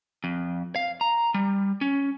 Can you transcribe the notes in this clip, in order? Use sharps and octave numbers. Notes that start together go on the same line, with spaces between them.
F2
F5
A#5
G3
C#4